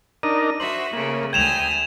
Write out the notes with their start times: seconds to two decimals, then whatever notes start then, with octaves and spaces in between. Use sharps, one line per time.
0.23 D4 D#4 A#4 D#7
0.60 F#4 C5 E5 F#7
0.93 C#3 A3 A#3
1.33 D2 G5 G#5 G#6 E7 F7